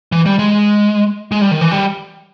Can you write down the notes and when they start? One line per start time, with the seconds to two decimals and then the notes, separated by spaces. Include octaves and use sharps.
0.12 E3
0.26 G3
0.39 G#3
1.32 G#3
1.41 G3
1.51 D#3
1.61 E3
1.71 G3